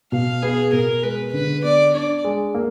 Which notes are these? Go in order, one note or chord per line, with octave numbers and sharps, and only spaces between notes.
B2 F5
B3 G#4
B2 A#4
G#3 B4
D3 B4
B3 D5
D4 D5
G#3
A#3